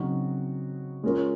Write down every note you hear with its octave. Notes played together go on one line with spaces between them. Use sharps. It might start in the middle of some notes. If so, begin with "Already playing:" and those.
Already playing: C#3 F#3 C4 D#4 F#4
G#3 C#4 F4 A#4 C#5